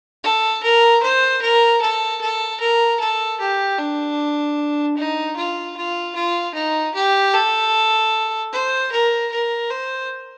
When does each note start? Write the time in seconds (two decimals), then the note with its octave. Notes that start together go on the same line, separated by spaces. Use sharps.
0.24 A4
0.63 A#4
1.03 C5
1.42 A#4
1.82 A4
2.21 A4
2.60 A#4
3.00 A4
3.40 G4
3.79 D4
4.97 D#4
5.36 F4
5.77 F4
6.15 F4
6.55 D#4
6.95 G4
7.34 A4
8.53 C5
8.92 A#4
9.32 A#4
9.71 C5